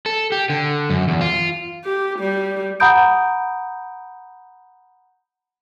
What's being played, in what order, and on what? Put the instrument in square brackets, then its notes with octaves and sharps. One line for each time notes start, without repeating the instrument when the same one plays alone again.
[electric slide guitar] A4
G4
D3
F#2
E2
F4
[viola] G4
G3
[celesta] F#5 A#5 B5 D#6 G6 D7